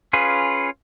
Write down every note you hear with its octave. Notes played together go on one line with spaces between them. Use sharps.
C#4 F4 G#4 B4